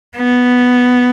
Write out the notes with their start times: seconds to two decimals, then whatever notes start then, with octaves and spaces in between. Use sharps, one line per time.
0.17 B3